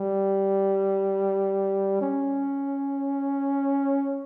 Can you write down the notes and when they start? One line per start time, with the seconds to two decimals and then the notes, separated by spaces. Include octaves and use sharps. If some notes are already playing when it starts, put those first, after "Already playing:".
Already playing: G3
2.01 C#4